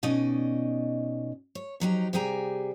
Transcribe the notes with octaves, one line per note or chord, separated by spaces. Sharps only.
B2 C#4 D#4 D5 D#5
C#5
F2 F#3 D#4 G4
C3 G3 G#4 G5 G#5 A#5